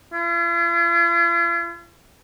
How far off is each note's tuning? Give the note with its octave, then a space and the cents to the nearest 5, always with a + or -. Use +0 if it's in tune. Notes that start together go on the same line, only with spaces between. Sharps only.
F4 -45